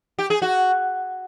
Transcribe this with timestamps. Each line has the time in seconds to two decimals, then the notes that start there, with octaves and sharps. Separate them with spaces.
0.19 G4
0.30 G#4
0.42 F#4